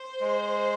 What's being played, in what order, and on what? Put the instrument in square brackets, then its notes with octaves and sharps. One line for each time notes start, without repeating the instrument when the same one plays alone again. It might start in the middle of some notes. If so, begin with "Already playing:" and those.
Already playing: [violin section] C5
[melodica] G#3